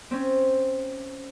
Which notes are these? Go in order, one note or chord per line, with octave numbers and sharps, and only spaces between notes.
C4 C#4